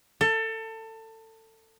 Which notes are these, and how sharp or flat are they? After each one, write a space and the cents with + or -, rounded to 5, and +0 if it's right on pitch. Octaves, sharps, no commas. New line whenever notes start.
A4 +25